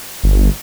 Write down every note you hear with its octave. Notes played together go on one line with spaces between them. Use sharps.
G1